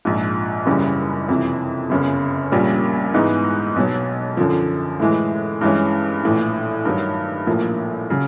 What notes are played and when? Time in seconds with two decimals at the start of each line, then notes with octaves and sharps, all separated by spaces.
0.05 A#1 G#2 F3
0.66 F#1 F#2 C#3 E3 G3
1.29 F2 C3 E3
1.90 G1 F#2 C#3
2.52 A#1 A#2 G3 A#3 C#4
3.14 G#2 E3 G#3 B3 D#4
3.76 B1 B2 F#3
4.37 F#2 D3 F3
5.00 A2 E3 G#3
5.61 G2 E3 G#3 C#4
6.23 A#1 A2 E3
6.85 G2 D#3 F#3
7.46 A#1 A2 F3 A#3
8.10 C#3 F#3